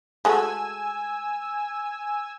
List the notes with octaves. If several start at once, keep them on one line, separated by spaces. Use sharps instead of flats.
G#3 A3 F#4 G#5 E6